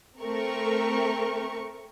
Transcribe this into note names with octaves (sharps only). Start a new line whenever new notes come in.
A3 C4 A#4 C#6